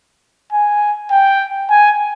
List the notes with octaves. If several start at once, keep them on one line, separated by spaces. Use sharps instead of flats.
G#5
G5
G#5